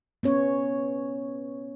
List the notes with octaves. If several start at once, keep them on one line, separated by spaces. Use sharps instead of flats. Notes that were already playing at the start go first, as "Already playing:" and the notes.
B3 C#4 C#5